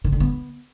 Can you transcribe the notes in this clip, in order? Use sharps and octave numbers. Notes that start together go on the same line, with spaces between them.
D#3
D3
B3